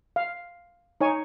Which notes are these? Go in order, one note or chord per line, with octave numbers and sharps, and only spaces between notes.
F5
D#4 C#5 G#5